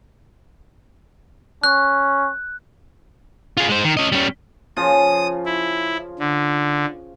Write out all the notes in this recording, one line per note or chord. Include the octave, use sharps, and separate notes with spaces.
C#4 F#6
F4 G#4
G#3 C5
D#3
C#4 D#5
G3 C#4
C#3 F3 F4 D#6
E4
D3